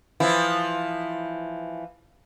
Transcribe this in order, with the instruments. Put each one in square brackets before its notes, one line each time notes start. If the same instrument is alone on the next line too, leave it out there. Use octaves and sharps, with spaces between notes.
[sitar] E3 F3 E4